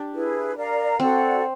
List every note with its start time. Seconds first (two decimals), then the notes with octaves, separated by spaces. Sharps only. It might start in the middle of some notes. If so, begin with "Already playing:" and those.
Already playing: D4 G4
0.12 E4 G#4 B4
0.55 A#4 D5 F5 A#5
1.00 C4 F#4 A4 D5 F#5